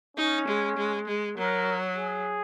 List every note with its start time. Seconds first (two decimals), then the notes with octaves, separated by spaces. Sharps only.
0.17 C#4 D#4
0.48 G#3
0.77 G#3
1.08 G#3
1.38 F#3 A#4
1.97 G#4